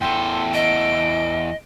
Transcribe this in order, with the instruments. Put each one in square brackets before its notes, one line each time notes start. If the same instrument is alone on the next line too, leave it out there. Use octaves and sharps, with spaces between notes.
[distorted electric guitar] E2 A4 [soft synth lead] G5 [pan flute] C6
[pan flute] D#5 [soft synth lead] D7